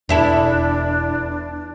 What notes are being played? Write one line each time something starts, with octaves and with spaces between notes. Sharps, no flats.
E1 E2 D4 E4 A4